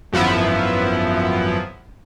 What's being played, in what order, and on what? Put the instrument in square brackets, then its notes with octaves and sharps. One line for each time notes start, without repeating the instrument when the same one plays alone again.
[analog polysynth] G#1 F#2 F3 B3 E4